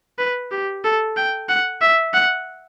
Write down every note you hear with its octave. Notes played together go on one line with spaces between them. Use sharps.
B4
G4
A4
G5
F#5
E5
F#5